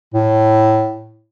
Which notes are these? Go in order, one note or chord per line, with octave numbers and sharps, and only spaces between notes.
A2